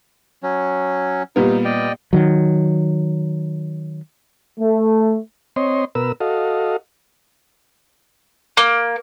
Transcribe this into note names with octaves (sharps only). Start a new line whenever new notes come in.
F#3 C#4
A#2 G3 B3 D#4
D5 D#5 G5
D#3 F#3
A3
C4 C#5 D#5 C6
B2 A#4 B4 E6
F#4 A4 D#5 F5
A#3